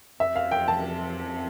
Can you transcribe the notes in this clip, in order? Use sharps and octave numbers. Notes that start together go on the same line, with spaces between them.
F2 C3 F3 E5
F5
G5
A5